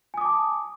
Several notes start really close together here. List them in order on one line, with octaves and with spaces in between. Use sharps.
G#5 D#6 D6 A5